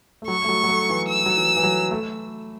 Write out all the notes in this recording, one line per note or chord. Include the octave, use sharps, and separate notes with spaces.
A3
F#3 C#6
A3
F#3
F#3
A3
E3
E6
F#3
E3
E3
F#3
A3